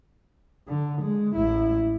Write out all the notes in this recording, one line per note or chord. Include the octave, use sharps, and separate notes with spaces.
D3
G#3
A1 E4